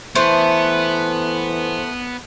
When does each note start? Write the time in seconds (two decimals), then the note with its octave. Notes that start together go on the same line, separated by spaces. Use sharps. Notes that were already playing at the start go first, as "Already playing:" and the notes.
0.15 E3 A3 B3 C5 C6